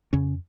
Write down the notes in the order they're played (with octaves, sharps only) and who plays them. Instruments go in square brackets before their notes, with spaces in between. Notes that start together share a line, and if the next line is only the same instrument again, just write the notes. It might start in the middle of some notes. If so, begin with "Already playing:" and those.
[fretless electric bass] F2 C#3 C#4